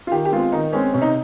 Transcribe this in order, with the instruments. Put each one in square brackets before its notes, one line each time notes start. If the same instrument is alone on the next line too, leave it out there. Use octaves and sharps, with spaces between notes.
[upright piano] F4
D#3 G4
G4
G#3 C4 F4
D#3 D#4
G#3 C4 C#4
C3 C#4
D#4